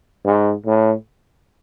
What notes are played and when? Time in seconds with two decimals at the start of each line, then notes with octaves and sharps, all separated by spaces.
0.25 G#2
0.66 A2